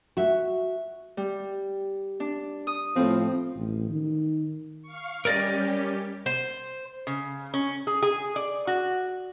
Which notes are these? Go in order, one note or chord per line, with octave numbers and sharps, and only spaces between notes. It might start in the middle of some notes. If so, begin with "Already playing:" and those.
F#4 E5
G3
D4
D#6
A2 F3 C4
A1
D#3
F5 C#6
G3 C#4 G4 A#4 D5 D#5
C5
C#3
C#4
G#4
G#4
D5
F#4